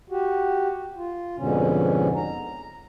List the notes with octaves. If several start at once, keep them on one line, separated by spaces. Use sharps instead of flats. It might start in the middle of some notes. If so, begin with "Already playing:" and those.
F#4 G4
F4
F2 G#2 B2 D3 C#4
A#5